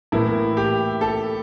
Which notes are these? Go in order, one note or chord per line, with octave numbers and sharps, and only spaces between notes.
A2 E3 A#3 E4
G4
A4